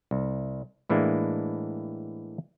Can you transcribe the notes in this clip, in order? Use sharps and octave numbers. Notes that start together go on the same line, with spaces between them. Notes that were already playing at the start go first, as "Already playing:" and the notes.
C2
A2 E3 G#3 A#3 D4